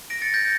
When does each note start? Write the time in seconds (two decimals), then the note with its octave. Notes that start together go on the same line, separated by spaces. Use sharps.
0.10 A#6 D7
0.22 A6 C#7
0.34 G6 A#6